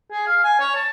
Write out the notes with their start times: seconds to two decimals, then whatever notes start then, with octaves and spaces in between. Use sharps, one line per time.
0.12 G#4
0.27 F5
0.44 G#5
0.60 C#5
0.75 A5